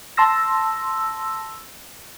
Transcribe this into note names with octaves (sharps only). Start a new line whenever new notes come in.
A5 C6 E6 A#6